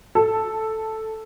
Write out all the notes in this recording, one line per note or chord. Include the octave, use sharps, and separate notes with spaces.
A4